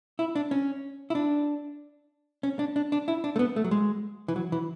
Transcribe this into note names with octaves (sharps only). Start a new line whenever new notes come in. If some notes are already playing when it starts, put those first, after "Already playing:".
E4
D4
C#4
E4
D4
C#4
D4
D4
D4
E4
D4
A3
B3
A3
F#3
G#3
E3
F#3
E3